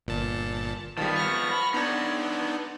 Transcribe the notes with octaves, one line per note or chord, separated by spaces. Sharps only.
G1 A#2 A5
D#3 F3 G3 B3
C#6 F6 A#6
B5
B3 D4 D#4 C#5